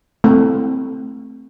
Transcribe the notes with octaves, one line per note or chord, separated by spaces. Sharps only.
A3 C4 E4